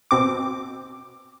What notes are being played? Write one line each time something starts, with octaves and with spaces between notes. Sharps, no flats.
B2 C4 D6